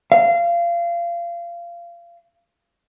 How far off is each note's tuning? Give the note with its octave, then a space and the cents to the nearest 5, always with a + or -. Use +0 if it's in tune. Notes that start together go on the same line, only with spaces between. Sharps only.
F5 -25